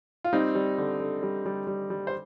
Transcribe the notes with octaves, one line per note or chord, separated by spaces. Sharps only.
F4
G3 C4 D#4
G3
D3
D3
G3
G3
G3
G3
C5